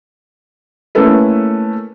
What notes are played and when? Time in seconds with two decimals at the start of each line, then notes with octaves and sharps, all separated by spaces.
0.95 A3 A#3 C#4 E4 A4 B4